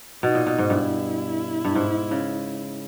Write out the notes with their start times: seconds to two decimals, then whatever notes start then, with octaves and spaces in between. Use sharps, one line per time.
0.23 B2 D#4
0.35 A#2
0.47 B2
0.58 G#2
0.70 G2 E4
1.65 G2
1.75 G#2
2.11 C#3